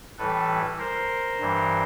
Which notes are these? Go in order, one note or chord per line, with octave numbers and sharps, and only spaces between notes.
A2 E3 G3 A4 B4
A#4 C5
G2 E3 G3